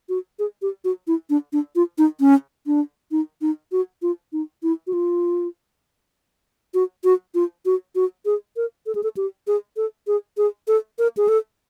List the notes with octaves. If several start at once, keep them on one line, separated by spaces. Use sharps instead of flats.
F#4
G#4
G4
F#4
E4
D4
D4
F4
D#4
C#4
D4
D#4
D#4
F#4
F4
D#4
E4
F#4
F4
F#4
F#4
F4
F#4
F#4
G#4
A#4
A4
G#4
A4
G4
G#4
A4
G#4
G#4
A4
A#4
G#4
A4